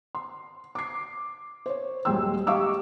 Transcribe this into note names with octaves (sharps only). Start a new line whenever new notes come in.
C6
D6 C7
C5 C#5
D#1 F#3 G#3 G5 C6 E6
G4 D#5 F5 C#6 D6 E6